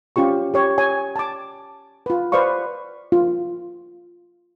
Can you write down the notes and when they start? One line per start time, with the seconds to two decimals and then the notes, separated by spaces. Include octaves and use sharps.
0.16 C#4 F4 G4 C#6
0.54 G4 C#5
0.78 C#5 G#5
1.16 A5 D6
2.06 F4 B4
2.32 B4 C5 D5 F5 C#6
3.12 F4